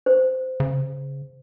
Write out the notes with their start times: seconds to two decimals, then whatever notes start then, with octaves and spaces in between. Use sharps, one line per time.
0.06 C5
0.60 C#3